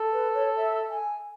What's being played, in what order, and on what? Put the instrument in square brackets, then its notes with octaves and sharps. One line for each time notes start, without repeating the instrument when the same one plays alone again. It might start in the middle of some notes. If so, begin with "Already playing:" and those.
Already playing: [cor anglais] A4
[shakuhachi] B4
C#5
E5
G#5